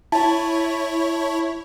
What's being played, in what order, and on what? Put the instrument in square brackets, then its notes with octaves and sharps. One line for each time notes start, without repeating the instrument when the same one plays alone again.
[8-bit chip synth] E4 C#5 [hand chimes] A5